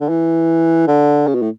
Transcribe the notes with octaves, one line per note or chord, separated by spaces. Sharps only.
D3
E3
D3
C#3
B2
A2